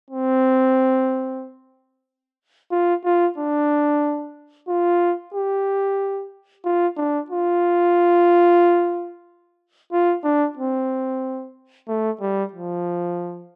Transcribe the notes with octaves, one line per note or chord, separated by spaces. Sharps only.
C4
F4
F4
D4
F4
G4
F4
D4
F4
F4
D4
C4
A3
G3
F3